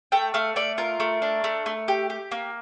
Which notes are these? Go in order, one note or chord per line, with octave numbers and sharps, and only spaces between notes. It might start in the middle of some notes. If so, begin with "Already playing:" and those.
A3 G5
A3 F5
A3 D5
F4 A#4
A3
D4
A3
A3
G4
G4
A#3